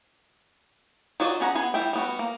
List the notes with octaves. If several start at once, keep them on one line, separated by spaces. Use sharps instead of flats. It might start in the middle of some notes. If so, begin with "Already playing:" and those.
F#3 F4 F#4 D5 D#5
F#3 C#4 G#4 F#5 A#5
B3 G#4 G#5
E3 G3 E4 E5 G5
G3 B3 F#4
A#3